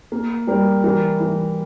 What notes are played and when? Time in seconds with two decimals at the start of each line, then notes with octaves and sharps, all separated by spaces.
0.12 A#3
0.47 G3 A#4
0.84 E3 A#4
1.20 E3